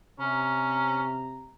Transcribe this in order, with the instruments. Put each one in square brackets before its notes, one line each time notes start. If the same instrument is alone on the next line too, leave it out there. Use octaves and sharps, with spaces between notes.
[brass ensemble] C3 A#5 [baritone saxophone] C#4